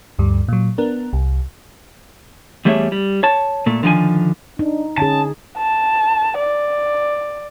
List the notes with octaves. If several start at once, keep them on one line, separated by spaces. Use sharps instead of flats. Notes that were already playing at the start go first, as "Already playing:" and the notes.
D2 G2 G3
A#2 F#3
B3 D4 A#4
C2
E2 G3 A3 G#4 C#5 E5
G3
C#5 A5
A#2 A3
D3 D#3 F3 G#5
D4 D#4
D3 C#4 G#4 A5
A5
D5